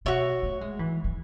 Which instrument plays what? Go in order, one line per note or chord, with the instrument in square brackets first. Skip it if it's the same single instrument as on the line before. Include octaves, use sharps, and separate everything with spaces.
[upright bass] B2 [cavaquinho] F#4 C#5 E5
[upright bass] A3
G#3
E3
E3